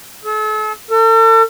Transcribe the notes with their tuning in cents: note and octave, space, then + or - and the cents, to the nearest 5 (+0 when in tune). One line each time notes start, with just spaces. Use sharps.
A4 -40
A4 +40